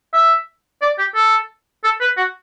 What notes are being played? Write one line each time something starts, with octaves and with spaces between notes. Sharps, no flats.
E5
D5
G4
A4
A4
B4
F#4